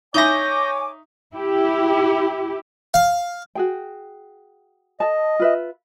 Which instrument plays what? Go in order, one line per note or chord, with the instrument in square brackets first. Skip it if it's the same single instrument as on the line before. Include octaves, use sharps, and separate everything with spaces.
[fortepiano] D#4 E5 C#6 [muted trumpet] C#5 [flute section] G#5 D6 [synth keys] G6 A#6
[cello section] E4 G4
[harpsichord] F5
[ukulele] F#4 G#4 G5
[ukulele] A4 A5 [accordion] D#5
[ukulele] F4 B4 E5